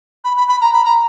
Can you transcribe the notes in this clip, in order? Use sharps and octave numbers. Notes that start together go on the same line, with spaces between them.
B5
B5
B5
A#5
B5
A#5